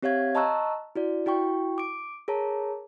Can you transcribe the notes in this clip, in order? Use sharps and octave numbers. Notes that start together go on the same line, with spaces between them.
C4 G4 C#5 E5 F5 G#6
D#5 A5 A#5 C#6 E6 F#6
E4 F#4 D5
E4 F#4 G5 C#6
D6 D7
G#4 A#4 C#5 A5 A#5